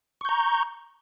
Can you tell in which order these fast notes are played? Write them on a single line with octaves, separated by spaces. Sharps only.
C#6 G6 A#5